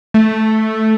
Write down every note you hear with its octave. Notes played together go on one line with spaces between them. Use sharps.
A3